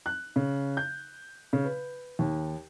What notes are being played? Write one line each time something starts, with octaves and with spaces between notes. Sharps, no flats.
F#6
C#3
G6
C#3
B4
D#2